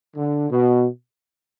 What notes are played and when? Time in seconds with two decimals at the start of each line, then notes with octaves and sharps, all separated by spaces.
0.17 D3
0.50 B2